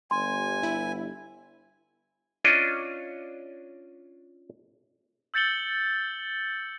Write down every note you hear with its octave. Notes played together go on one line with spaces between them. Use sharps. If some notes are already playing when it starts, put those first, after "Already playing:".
G1 G#5 C6
E4
C#4 D4 F4 D#5
E6 G6 A6 C#7 F#7 G7